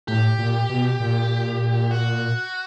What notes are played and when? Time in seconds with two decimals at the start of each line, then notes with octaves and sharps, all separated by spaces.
0.08 A2 G4
0.38 A#2
0.69 B2
1.00 A#2
1.91 F#4